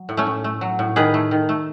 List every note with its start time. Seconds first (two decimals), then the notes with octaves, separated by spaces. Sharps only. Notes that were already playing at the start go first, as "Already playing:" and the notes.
Already playing: F#3
0.09 A2
0.17 A3 C#4
0.27 A2
0.44 A3
0.61 F#3
0.79 A2
0.96 D#3 G#4 B4
1.14 A3
1.31 D#3
1.49 A3